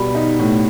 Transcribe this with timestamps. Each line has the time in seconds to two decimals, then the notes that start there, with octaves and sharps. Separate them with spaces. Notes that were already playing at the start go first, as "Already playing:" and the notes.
Already playing: B2 G3 B5
0.15 D#4
0.39 A2